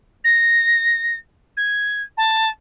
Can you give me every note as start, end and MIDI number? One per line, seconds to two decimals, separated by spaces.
0.24 1.16 94
1.57 2.01 92
2.17 2.49 81